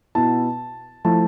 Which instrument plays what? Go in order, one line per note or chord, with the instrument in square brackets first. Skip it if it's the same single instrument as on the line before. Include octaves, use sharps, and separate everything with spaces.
[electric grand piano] B2 B3 E4 [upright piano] A5
[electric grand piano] F3 A3 E4 [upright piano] A5